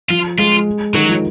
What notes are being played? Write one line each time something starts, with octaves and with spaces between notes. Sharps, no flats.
F3 F4
G#3 F4
D#3 F#3
F3